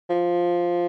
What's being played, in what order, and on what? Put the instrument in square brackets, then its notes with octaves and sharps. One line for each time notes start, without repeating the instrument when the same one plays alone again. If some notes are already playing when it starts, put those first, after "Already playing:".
[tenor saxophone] F3